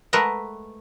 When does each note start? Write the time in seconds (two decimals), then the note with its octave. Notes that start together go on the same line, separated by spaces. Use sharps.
0.13 G#3 A3 A#4 B4 F#5